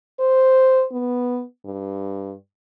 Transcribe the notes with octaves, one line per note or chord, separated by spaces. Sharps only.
C5
B3
G2